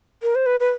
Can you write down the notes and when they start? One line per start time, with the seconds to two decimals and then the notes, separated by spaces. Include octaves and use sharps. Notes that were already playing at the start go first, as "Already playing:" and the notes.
0.23 A#4
0.35 C5
0.46 B4
0.60 B4